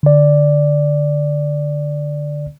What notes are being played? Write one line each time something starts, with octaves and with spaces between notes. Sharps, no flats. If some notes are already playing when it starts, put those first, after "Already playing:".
D3 D5